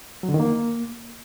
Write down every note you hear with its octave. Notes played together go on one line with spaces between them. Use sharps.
F#3
D3
D#3
A#3